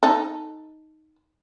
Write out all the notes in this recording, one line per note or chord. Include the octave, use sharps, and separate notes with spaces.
D#4 A4